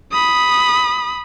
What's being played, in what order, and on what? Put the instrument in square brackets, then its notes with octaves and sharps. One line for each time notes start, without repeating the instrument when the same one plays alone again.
[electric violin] B5 D#6